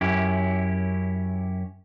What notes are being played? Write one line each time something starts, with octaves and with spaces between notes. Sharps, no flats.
F#2 C#4 E4 G4